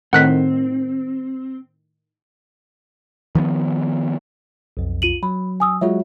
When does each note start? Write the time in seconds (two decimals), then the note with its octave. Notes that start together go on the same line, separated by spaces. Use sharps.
0.13 A2 D#3 C4 F#5 F#6 B6
3.35 D#3 F3 G3 B3
4.77 B1 F2
5.02 F4 D#7 F#7
5.23 F#3 B5
5.60 G#5 D#6 E6
5.81 F#3 G#3 F4 F#4 C#5 E5